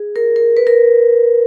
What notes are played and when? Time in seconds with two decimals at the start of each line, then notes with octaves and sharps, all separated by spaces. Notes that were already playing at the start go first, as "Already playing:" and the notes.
Already playing: G#4
0.16 A#4
0.36 A#4
0.57 B4
0.67 A#4